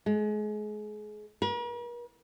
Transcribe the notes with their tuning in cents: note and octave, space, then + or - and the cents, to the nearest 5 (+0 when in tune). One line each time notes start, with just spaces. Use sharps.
G#3 +30
A#4 +45